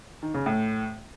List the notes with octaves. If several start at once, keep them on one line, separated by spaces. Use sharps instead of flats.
D#3
C#3
A2